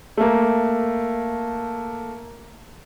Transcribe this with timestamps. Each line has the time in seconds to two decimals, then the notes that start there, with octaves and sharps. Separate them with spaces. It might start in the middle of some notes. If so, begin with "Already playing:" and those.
0.17 A3 A#3